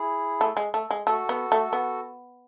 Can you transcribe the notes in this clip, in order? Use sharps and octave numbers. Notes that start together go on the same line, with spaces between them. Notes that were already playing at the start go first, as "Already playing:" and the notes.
Already playing: E4 G#4
A3
G#3
A3
G#3
A3 F#4 A4
B3
A3
B3